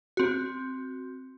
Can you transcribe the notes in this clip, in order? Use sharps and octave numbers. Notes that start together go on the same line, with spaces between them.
C4 F#4